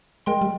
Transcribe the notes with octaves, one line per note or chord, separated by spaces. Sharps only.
G#3 A#4 D#5 G5 C6
G3